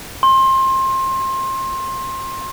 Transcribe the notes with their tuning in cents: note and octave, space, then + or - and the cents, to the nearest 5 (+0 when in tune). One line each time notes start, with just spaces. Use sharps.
C6 +25